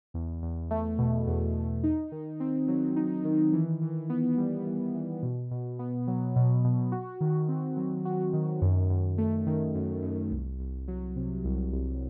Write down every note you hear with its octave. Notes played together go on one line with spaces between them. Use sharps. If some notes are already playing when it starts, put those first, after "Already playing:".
E2
E2
A3
B2
E2
E2
D#4
D#3
C4
F#3
D#4
D#3
E3
E3
B3
G3
E3
E3
B2
B2
B3
F#3
B2
B2
F#4
D#3
C4
F#3
F#4
D#3
F#2
F#2
A3
D#3
F#2
F#2
C2
C2
F#3
C3
C2
C2